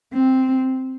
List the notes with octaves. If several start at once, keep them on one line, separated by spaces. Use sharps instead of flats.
C4